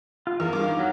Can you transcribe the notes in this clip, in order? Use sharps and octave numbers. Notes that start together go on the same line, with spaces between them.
F4
E2 A#4 F5
G2 D6
D#3
F#3